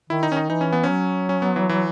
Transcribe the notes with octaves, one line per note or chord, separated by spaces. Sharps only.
D#3 E4
D#4
D#3 C#4
D#4
E3 D#4
C#4
B3
C#4
F#3
C#4
B3
E3
E3